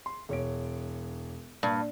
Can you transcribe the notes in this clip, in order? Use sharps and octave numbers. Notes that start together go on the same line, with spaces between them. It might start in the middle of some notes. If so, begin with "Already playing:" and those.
C6
E1 C#5 D7
G2 A#2